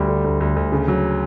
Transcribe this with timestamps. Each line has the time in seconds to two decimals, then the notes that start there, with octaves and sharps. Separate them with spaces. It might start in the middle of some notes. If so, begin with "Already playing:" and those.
Already playing: D2 G3
0.08 D3
0.24 D2
0.40 D2
0.56 D2
0.72 C#3
0.88 F#3